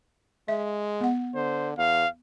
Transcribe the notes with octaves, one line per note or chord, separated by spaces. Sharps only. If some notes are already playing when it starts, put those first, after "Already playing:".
G#3 E5
B3 F#5
D3 C5
E2 F5